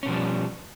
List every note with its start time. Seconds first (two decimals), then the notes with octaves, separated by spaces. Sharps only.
0.03 C#4
0.06 B2
0.08 F3
0.11 G3